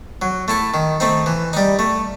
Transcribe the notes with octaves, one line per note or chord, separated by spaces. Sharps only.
F#3
A3 E4 A4
D#3
A3 C4 D#4
E3
G3 D#4
A3